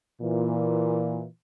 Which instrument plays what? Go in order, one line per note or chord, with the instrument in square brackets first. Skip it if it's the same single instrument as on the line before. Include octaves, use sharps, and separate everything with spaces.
[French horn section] A#2 E3